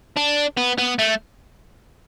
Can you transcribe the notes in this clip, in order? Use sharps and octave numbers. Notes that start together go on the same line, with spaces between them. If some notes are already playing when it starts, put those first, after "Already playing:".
D4
B3
B3
A3